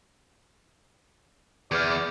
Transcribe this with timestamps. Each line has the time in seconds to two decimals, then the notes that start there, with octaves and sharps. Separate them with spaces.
1.72 E2 G#4 B4 D5 F6 G6 G#6